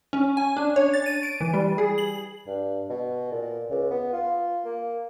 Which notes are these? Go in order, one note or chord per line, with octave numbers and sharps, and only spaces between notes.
C#4
G#5
D4
C#5
A6
D#7
D7
E3
G3
G#4
F#7
G2
B2
A#2
C#2
B3
F4
A#3